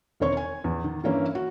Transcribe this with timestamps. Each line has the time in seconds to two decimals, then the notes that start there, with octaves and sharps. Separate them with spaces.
0.20 E1 D#3 C4 C#5 C#6
0.37 G#5
0.64 E2
0.84 D#3
1.03 G2 E3 A#3 C#4 E4
1.35 F#4